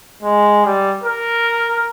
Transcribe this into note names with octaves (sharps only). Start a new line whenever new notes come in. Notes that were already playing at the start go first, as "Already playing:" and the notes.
G#3
G3
A#4